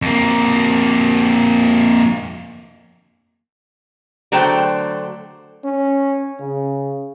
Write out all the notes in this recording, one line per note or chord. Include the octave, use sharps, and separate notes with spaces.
F2 A#3
D3 F#3 A3 C5 G5
C#4
C#3